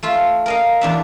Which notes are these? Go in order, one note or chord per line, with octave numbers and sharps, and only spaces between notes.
A3 F4 E5
A#4 D#5 F5
E2 D4 E5